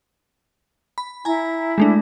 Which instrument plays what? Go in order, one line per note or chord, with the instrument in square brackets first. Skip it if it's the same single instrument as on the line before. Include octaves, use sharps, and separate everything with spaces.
[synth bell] B5
[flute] E4 [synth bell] G#5 A#5
[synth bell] G#3 A3 D4